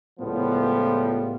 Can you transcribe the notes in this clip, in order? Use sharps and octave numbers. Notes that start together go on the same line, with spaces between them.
C#2 A2 F3 G3 B3